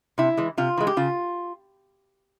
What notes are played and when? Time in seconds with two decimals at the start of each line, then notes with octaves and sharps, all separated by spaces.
0.18 C3 E4
0.37 E3 G#3
0.58 C3 F4
0.77 E3 G#3
0.87 G4
0.97 C#3 F4